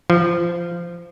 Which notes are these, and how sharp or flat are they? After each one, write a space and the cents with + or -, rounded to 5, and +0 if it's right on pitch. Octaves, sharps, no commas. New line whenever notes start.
F3 -20